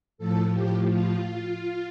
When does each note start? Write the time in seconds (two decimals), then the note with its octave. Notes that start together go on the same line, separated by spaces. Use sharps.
0.18 A2 F3 A4
0.53 G4
0.88 F4